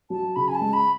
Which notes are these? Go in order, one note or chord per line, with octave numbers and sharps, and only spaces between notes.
F#3 A5
C#3 B5
G#5
A5
G#3
B5